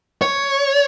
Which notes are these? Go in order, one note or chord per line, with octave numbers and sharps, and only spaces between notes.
C#5